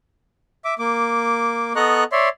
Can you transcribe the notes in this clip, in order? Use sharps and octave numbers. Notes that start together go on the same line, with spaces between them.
E5 D6
A#3 D6
B3 A4 D#5 A#5 C#6 F#6
C#5 D5 E5 C6